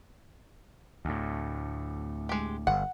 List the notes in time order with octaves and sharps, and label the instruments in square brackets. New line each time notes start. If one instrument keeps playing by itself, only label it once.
[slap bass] D2 A2
[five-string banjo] G#3 G4
[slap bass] G1 [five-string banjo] F#5